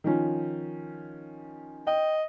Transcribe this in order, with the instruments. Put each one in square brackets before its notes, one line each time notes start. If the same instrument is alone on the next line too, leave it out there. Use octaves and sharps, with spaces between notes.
[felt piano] D#3 F3 C#4
[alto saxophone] D#5 [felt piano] G5